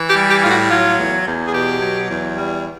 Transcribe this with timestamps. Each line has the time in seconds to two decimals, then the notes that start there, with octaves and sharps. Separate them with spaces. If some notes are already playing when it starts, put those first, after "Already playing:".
Already playing: E3
0.08 G4
0.16 G3
0.29 G4
0.43 A2 F4
0.50 F#4
0.70 F#3 F4
0.98 E2
1.26 E2
1.47 G#4
1.53 B2 G4
1.81 F#3
2.09 E2
2.36 G3